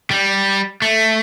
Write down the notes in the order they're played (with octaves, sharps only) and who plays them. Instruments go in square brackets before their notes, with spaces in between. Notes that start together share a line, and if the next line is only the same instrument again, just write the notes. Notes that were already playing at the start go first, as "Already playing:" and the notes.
[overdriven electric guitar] G3
A3